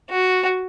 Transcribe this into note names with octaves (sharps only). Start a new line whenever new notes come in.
F#4